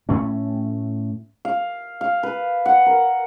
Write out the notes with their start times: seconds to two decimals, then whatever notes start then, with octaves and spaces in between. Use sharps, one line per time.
0.09 A2 A3 C#4
1.45 F5
2.01 F5
2.23 B4
2.66 F#5
2.86 A#4